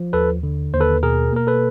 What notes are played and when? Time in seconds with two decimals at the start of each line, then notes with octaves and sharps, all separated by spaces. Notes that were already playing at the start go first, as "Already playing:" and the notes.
Already playing: F3
0.13 D#2 A4 B4
0.43 D3
0.73 D#2 C5
0.80 A4 B4
1.03 B2 G#4 A#4
1.32 A#3 A#4
1.47 A4 B4